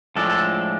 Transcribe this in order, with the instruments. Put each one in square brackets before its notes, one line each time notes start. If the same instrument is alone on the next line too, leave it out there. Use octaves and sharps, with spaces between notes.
[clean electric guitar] A2 F3 G#3 D4 A4
A4